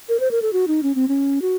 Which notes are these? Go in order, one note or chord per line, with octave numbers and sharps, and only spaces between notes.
A#4
C5
A#4
A4
F#4
D#4
C#4
C4
C#4
F#4